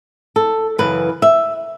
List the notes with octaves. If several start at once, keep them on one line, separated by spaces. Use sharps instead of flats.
A4
F#2 C#3 E3 B4
E5